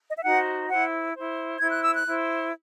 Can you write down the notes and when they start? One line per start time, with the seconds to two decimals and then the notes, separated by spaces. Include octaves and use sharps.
0.08 D#5
0.17 E5
0.23 D#4 F#4 C5 F#5
0.69 E4 C5 F#5
1.14 E4 C5
1.59 E4 C5 G#6
1.71 F#6
1.83 E6
1.95 F#6
2.05 E4 C5